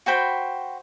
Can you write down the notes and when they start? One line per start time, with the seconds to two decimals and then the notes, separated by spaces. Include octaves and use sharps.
0.06 F#4 C5 G5 B5